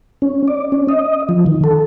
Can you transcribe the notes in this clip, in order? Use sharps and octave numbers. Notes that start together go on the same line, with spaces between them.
C#4
D5
C#4
D#5
F3
D#3
A4